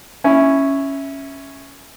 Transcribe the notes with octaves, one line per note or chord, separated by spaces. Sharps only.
C#4 E4